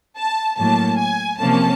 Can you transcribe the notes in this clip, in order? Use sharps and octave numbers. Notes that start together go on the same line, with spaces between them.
A5
A2 F#3 A#3 A5
G#5
C3 F3 A#3 C#4 A5